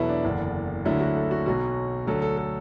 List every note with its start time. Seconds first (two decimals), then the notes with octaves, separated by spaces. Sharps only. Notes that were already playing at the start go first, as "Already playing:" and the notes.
Already playing: E2 B2 F#3 E4 A4 B4
0.09 D4
0.24 F#1 E2 D3
0.85 D2 D3 F#3 E4
1.00 F#4
1.16 A4
1.31 F#4
1.46 B1 B2 F#3 F#4
2.07 D2 D3 F#3 A4
2.22 A4
2.37 A4